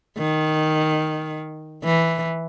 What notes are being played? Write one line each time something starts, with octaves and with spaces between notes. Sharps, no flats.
D#3
E3